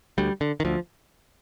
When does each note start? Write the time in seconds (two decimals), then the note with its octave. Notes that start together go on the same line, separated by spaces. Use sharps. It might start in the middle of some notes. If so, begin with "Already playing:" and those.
0.18 D2 G3
0.41 D3
0.60 D#3
0.65 D2 F3